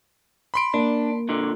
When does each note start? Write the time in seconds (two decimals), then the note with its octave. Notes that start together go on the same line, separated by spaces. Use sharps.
0.54 B5 C6 D7
0.74 A#3 D4
1.29 A#2 D3